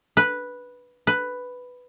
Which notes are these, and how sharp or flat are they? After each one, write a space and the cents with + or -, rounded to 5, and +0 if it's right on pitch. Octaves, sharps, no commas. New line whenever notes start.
B4 -5
B4 +5